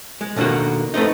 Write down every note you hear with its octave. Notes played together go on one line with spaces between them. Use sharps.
G#3
B2 D3 D#3 A#3 F#4
A3 B3 C4 D#4